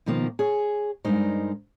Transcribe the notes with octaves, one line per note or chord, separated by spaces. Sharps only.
B2 D#3 F3 A#3
G#4 C#5
G2 G#3 D#4 A#4 C5